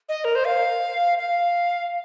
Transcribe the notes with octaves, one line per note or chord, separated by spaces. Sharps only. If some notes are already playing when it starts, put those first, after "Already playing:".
D#5
A#4
C5
F5
F5